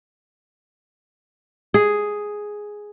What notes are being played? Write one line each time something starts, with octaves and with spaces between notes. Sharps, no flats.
G#4